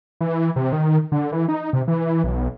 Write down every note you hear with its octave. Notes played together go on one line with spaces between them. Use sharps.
E3
C3
D#3
D3
E3
D#4
C3
E3
B1